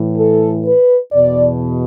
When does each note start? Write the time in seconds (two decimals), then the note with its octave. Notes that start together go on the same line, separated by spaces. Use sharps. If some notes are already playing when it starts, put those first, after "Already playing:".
Already playing: A2 E3
0.18 A4
0.65 B4
1.12 E2 B2 D5